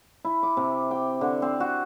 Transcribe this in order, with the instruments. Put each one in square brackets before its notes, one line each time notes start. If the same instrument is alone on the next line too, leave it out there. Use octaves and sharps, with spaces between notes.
[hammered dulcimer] E4
D6
C3
G5
D3
C4
F#4